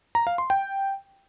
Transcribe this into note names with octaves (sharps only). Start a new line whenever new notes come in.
A#5
F5
C6
G5